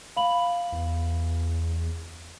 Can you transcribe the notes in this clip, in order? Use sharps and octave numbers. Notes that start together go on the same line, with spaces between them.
F5 B5 F#7
E2